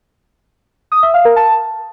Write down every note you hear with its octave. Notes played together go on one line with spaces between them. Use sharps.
D#6
E5
F5
A#4
A5